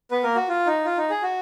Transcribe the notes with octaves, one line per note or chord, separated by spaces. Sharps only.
B3 B4
A#3 A#4
F#4
F4
D#4
F4
D#4
G#4
F#4